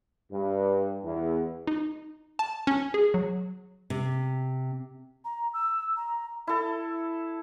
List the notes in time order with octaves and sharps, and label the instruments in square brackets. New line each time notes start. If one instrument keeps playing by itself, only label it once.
[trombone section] G2
E2
[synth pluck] D#4
A5
C#4
G#4
F#3
[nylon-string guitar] C3
[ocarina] A#5
E6
A#5
[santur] E4 A4